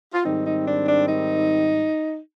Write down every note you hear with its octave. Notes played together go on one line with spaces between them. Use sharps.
F4
G#2 D#3 G3 C4 D#4
D#4
D4
D4
D#4